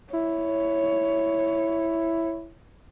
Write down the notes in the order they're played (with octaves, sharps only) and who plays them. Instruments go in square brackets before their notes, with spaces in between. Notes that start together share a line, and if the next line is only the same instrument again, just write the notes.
[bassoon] E4 [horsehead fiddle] C#5